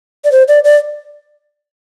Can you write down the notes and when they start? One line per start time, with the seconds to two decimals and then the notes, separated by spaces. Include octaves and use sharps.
0.24 D5
0.32 C5
0.48 D5
0.64 D5